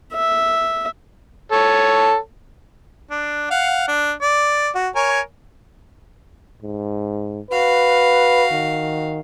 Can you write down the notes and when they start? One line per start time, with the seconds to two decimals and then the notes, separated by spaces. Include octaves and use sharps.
0.13 E5
1.52 A4 C#5
3.11 D4
3.51 F5 F#5
3.88 D4
4.22 D5
4.75 F#4
4.96 A#4 C#5 G#5
6.63 G#2
7.51 F#4 B4 F5
8.52 D#3